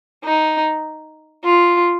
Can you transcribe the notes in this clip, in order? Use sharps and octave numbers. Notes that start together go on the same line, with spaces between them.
D#4
F4